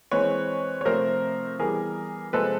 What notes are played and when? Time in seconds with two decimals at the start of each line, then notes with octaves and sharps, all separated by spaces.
0.11 E3 G#3 C4 B4 C#5
0.81 C#5
0.85 C3 F3 A3 C4 A#4 C5
1.59 E3 G3 B3 G#4 A#4
2.33 C3 F3 G#3 C4 A4 B4